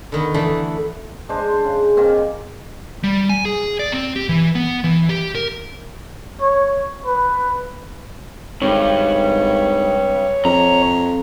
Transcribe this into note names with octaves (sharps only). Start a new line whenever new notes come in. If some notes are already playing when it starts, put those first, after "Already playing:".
D3 D#3 B3
D3 E3 A3
G#3 D4 C5
C#3
D#3 A#3 C4
G3
G#5
G#4
D5
C4
G4
E3
B3
E3
G4
A#4
C#5
B4
G#1 G2 C#5
F2 A#5